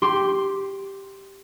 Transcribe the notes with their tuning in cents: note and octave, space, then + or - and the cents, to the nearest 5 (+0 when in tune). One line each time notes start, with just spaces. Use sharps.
G4 +0 C6 +0